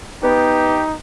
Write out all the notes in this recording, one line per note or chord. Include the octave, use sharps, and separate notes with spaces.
B3 D#4 G4